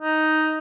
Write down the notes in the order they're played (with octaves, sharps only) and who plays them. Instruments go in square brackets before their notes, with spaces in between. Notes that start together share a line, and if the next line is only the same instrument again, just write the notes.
[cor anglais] D#4